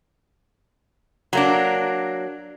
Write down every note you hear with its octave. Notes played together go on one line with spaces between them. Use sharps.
F#3 A#3 D4